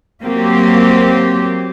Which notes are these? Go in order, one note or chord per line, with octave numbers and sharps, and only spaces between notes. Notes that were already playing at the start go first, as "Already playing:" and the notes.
F#3 A#3 C4 G4